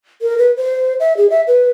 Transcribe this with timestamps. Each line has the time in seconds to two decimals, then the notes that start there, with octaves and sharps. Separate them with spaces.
0.22 A#4
0.38 B4
0.57 C5
1.00 E5
1.17 G#4
1.30 E5
1.47 B4